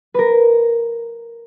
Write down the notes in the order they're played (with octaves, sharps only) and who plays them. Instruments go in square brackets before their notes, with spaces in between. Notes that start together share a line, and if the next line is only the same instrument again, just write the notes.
[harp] A#4 B4